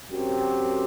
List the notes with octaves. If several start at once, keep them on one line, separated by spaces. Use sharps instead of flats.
F#2 F#3 C4 G4